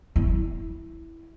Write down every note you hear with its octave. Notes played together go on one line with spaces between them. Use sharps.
E4